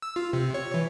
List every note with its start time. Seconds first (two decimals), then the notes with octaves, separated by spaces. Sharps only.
0.02 E6
0.16 F4
0.33 C3
0.54 C#5
0.74 E3